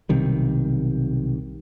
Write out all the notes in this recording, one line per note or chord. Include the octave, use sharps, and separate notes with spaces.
B1 C3 D#3 G3